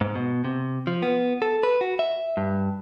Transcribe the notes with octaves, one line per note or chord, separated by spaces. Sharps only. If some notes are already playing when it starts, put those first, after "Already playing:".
G#2
B2
C3
F3
B3
A4
B4
F#4
E5
G2